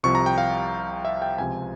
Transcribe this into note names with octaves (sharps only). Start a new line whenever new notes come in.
C2 C3 F3 C#6
A#5
G5
F5
E5
G5
C#2 C3 F3 G#5